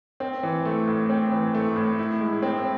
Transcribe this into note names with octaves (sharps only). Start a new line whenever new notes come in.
C4
E3
A3
A2
C4
E3
A3
A2
E4
G#3
C4